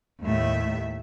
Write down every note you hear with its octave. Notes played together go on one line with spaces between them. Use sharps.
D#2 A2 E5